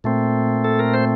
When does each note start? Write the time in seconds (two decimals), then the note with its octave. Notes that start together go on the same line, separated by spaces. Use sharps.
0.04 A#2 A3 C4
0.65 A4
0.79 A#4
0.94 C5